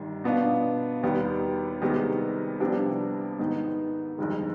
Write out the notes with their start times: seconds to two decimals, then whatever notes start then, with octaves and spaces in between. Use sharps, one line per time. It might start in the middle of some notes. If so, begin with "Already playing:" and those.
Already playing: G1 G2 D#3
0.24 B2 B3 D4 F4
1.03 D#2 D#3 G3 B3
1.82 C2 C3 D#3 G#3 B3
2.60 C2 C3 F3 B3 D4
3.39 G#2 D#3 B3 D#4
4.18 G1 F2 C3 D#3 G#3